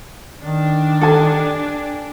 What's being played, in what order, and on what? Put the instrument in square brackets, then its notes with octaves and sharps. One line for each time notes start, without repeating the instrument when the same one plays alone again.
[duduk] D#3 [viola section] D4
[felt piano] G4 G#5 A5 [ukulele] A4